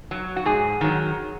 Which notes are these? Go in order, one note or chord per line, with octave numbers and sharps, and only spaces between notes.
F#3
F#4
G#2 G#4
D#3 F#3